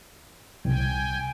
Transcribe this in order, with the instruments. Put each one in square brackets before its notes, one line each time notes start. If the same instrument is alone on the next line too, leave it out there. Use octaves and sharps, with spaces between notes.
[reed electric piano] C2 [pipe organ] G5 G#5